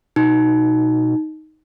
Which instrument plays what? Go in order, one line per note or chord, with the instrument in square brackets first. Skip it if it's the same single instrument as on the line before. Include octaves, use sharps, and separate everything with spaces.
[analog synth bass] B2 [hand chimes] D#4